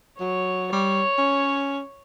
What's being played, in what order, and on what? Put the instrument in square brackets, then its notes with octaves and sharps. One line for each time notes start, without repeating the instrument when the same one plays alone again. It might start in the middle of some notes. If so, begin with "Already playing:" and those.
[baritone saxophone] F#3 [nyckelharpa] C#5
[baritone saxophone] G3 [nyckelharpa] C#5
[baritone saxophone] C#4